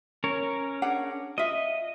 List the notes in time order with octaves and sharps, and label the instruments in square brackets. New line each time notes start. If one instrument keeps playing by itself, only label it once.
[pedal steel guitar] C#4 A#4 C#5
[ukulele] D4 G#4 F#5
[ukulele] F4 E5 [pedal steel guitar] D#5